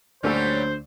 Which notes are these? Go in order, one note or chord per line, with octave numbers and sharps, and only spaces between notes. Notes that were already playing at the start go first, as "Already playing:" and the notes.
D2 A#2 F#3 G3 A3 C#4 A4 C5